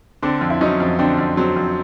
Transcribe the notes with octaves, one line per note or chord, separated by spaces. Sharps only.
D3 C4 D4
F2
E4
F#3 C#4 D#4
F2
D3 C4 D4
F2
F#3 C4
F2